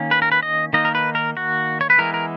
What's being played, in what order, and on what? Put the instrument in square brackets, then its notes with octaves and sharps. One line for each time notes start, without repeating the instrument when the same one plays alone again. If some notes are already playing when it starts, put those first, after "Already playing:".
Already playing: [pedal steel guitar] D#3 A#3 C#4
B4
A#4
B4
D#5
D#3 A#3 D#4 D#5
A#4
B4
A#4
F#4
C#5
B4
E3 G#3 B3 A#4
A#4